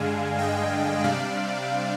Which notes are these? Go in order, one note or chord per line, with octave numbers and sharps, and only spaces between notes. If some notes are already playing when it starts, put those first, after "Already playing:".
Already playing: G2 D3 G#3 D4 F5 G#5
D#5 G5
C3 G3 D4 D5 F5